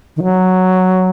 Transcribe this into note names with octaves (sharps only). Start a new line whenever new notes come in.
D#3
F#3